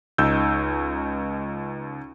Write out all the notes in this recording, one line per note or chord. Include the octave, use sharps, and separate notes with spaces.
C#2 D#4 E6 G6